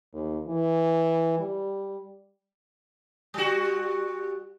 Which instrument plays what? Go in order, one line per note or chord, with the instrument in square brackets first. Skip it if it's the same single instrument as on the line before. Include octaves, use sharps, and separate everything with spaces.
[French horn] D#2
E3
G3
[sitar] G3 F#4